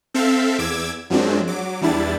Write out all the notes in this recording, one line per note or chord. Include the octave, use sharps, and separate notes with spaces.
C4 A4 E5 F5
E2 D6 E6 G#6
F#2 F3 F#3 G#3 C4 D4
F#3 D6
E2 G3 D4 E4 A6